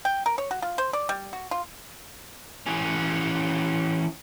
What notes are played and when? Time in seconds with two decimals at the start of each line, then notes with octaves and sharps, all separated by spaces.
0.05 G5
0.26 A#4
0.38 C#5
0.51 F#4
0.62 F4
0.78 C5
0.93 D5
1.09 G3
1.33 F#4
1.51 F4
2.67 E3 C#4